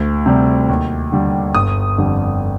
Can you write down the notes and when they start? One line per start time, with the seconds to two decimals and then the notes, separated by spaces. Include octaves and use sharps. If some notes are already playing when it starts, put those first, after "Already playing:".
Already playing: D2
0.26 C3 G3
0.69 D#2
1.12 D3 G3
1.55 G1 D#6
1.98 F2 D3 G3